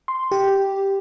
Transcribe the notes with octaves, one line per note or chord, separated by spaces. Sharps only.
C6
G4